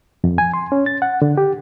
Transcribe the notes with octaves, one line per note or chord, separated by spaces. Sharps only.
F2
G#5
C6
C#4
A6
F#5
D3
G4